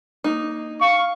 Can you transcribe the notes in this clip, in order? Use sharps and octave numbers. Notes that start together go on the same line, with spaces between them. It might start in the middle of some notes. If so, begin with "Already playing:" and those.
A#3 D#4
F5 C#6